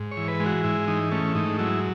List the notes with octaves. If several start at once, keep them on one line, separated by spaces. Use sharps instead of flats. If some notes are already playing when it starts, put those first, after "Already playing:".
Already playing: G#2
C#5
E3
B4
G#3
F#4
G#2 E4
E3 D#4
A3 C#4
G#2 D#4
F#3 E4